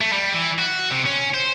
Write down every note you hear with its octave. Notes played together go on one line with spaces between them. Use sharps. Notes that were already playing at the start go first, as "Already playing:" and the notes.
A3
G3
E3
F#4
C3
C#4
C5